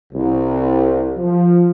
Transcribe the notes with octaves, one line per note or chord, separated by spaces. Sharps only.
C2
F3